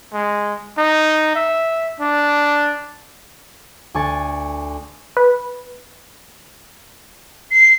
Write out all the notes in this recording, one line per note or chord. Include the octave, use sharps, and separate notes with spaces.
G#3
D#4
E5
D4
D2 G#5 C#6 A6
B4
C7